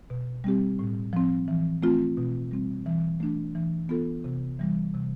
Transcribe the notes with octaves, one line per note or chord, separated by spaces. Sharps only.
B2
G3 C4 G4
A2
F3 C4
E3
A3 C4 F4
B2
G3 C4
E3
A3 D4
E3
B3 F4 A4
C3
E3 G3
C3